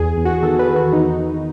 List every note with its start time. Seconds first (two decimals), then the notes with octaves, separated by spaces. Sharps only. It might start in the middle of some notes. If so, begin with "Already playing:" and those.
Already playing: E2 G#4
0.17 E2
0.25 F#4
0.42 D#3 A4
0.59 B4
0.68 E2
0.76 F#4
0.93 E2 D#4
1.18 E2